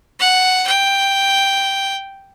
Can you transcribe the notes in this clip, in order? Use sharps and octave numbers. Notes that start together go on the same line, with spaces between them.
F#5
G5